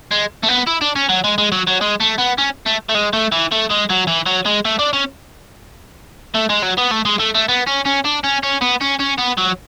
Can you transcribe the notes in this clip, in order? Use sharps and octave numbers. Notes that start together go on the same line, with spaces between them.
G#3
A3
B3
E4
D4
C#4
F#3
G#3
G#3
F#3
F#3
G#3
A3
B3
C#4
A3
A3
G#3
A3
E3
A3
G#3
F#3
E3
F#3
G#3
A3
D4
C#4
A3
G#3
F#3
B3
A3
G#3
A3
A3
B3
C#4
C#4
D4
C#4
C#4
B3
C#4
C#4
B3
F#3